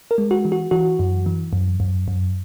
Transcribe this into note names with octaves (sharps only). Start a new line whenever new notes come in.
A#4
G#3
F#4
E3
F#4
E3 F#4
F#2
E3
F#2
F#2
F#2